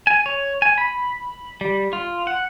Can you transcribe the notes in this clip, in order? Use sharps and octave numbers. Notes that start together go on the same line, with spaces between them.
G#5
C#5
G#5
B5
G3
F4
F#5